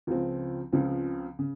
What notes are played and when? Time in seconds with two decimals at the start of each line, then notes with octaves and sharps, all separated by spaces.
0.07 C#2 C#3 F3 C4
0.72 C#2 C#3 F3 C4
1.39 C#3